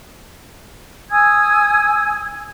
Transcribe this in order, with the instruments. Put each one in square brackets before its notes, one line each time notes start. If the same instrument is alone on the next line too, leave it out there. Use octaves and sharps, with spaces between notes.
[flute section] G#5 D#6 E6 G#6